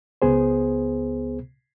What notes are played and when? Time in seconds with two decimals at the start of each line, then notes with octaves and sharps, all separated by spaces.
0.22 C#2 B3 G#4 C5